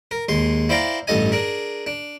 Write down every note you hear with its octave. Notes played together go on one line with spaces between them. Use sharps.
A#4
D#2 G#3 C6
E4 C5 D5 F5 G5 A#5
A1 G2 A4 D#5 G#5
D4 G#4 A#4
D4